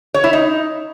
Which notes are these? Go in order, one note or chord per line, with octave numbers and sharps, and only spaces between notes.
C#5
E4
D#4